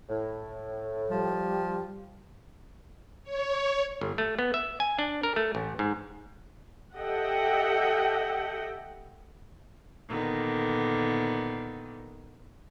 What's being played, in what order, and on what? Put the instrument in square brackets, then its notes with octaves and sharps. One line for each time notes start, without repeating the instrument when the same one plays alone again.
[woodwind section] A2
[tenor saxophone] F3 [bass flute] G3
[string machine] C#5
[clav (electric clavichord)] G1
A3
B3
E5
G#5
D4
A#4
A3
A1
G#2
[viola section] G4 A4 D#5 E5 F#5 G5
[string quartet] A#2 D3 D#3 B3